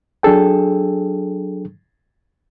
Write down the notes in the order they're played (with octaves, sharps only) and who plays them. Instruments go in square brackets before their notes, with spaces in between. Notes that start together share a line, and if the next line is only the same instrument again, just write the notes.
[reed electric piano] F#3 D4 G#4 A4 G5